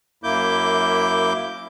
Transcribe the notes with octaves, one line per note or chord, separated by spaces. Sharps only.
F#2 A#3 E4 D6 G6